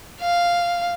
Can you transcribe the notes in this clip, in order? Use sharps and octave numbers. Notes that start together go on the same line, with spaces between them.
F5